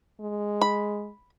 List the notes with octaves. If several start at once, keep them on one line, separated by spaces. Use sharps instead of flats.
G#3
B5